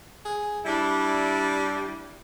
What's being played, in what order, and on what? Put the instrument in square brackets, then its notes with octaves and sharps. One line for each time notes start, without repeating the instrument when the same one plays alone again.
[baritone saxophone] G#4
[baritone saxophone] G3 [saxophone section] D4 E4